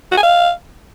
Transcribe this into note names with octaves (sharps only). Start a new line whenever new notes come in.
F#4
G#5
F5